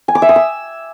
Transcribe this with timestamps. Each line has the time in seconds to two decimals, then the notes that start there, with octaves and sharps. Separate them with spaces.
0.08 G#5
0.15 D6
0.22 E5
0.29 D#6
0.36 E6